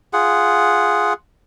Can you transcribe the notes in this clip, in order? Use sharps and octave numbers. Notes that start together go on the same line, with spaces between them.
F4 G#4 F#5